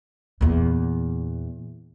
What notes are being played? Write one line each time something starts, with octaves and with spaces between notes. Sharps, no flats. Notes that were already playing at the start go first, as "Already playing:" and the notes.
E2 A#2